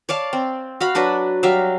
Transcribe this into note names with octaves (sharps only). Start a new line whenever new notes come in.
C#5 D5 F5 A5
C4
F#4 F5 B5
F#3 D4 F#4 B4
F#3 G3 E5 F5